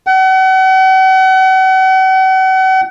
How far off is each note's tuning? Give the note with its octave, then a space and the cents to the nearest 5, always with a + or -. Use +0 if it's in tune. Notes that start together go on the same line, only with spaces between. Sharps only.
F#5 +40